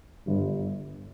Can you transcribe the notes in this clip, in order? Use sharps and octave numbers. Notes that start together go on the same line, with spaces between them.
G1 G2